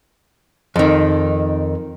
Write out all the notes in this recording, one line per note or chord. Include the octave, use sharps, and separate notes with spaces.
F2 D#3